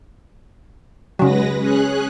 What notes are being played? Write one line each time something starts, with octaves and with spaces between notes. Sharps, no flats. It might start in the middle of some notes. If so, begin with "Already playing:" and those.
C#3 F#3 G#3 B4 A#6
C#4 G#4 F#6